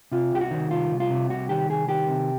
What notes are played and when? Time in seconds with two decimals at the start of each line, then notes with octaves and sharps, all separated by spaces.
0.12 C3 F4
0.32 C2 G4
0.41 F#4
0.51 D#3
0.71 C2 F4
0.91 C2
1.00 F4
1.10 C3
1.30 C2 F#4
1.49 D#3 G4
1.69 C2 G#4
1.88 D#3 G4
2.08 C3